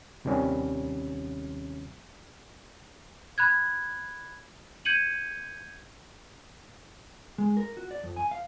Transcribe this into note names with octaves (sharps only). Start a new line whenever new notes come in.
D#2 C3 D#3 G3 C#4
B5 F#6 G#6
G6 G#6 C#7 D#7 F#7
G#3
A#4
F#4
D5
F2
G#5
F5